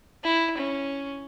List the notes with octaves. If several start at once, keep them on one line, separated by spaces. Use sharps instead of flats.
E4
C#4